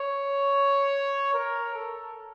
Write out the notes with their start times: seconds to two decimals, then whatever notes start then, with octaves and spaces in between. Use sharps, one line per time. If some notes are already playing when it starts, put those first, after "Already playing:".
Already playing: C#5
1.34 A#4
1.74 A4